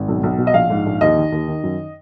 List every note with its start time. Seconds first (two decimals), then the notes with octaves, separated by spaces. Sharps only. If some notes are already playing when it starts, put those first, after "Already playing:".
Already playing: G#1
0.08 B1
0.23 B1
0.38 B2
0.47 D#5
0.54 A#1 F5
0.70 G#2
0.86 A#1
1.01 D#2 D#5
1.16 D#3
1.32 D#2
1.48 D#3
1.63 F#2